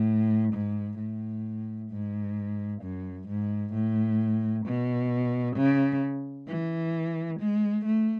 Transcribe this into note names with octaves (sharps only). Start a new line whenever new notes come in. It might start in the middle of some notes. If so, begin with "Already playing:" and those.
Already playing: A2
G#2
A2
G#2
F#2
G#2
A2
B2
C#3
E3
G#3
A3